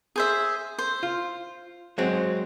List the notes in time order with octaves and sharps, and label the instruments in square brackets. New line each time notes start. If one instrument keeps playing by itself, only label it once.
[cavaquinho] G#4 C5 E5
C5
[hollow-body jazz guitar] F4
F#3 G#3 C4